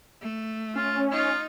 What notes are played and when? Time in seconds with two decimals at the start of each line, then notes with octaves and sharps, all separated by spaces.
0.21 A3
0.76 C#4 F4
1.12 D#4 F4